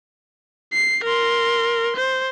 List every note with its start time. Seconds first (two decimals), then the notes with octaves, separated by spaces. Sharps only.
0.73 C7
1.04 A#4 C6
1.96 C5